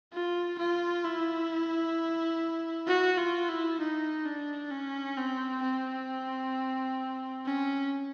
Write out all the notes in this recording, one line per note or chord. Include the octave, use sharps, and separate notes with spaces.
F4
F4
E4
F#4
F4
E4
D#4
D4
C#4
C4
C4
C#4